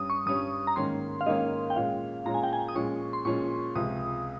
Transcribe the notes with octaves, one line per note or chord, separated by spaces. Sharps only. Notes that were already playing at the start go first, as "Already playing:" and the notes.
Already playing: G2 G3 C#4 D#6
C#6
G2 G3 C#4 D#6
A#5
G#2 D#3 A#3 C#4 C6
F5
G#2 D#3 A#3 C#4 D#5
G5
A#2 G#3 C#4 F5
A#2 G#3 C#4 A#5
G#5
G5
G#5
D#6
A#2 F3 G#3 C#4 C#6
C6
A#2 F3 G#3 C#4 C#6
C#2 C3 F3 G#3 D#6